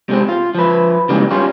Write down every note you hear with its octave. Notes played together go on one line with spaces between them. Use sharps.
C3 G#3 C4
F4
F3 B4
C#3 E3 G3 G#3 A#3 D#4
G3 C#4 F4